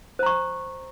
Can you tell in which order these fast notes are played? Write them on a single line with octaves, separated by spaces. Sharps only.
C5 A#5 C#6